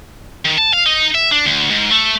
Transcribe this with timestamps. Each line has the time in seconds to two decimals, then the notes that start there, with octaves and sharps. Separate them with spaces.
0.45 D#3
0.58 A5
0.73 F5
0.86 D#4
1.15 E5
1.31 D4
1.46 D2
1.71 G#2
1.91 A3